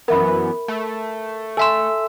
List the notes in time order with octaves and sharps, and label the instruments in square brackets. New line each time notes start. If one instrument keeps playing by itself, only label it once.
[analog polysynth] F#2 E3 B3 [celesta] A#4 E5 B5
[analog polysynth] A3
[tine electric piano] A4 E5 E6 [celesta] G#5 C6